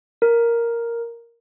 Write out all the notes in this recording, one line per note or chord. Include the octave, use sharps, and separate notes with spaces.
A#4